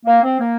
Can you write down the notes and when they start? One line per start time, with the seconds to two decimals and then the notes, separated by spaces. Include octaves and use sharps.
0.06 A#3
0.23 C4
0.40 A#3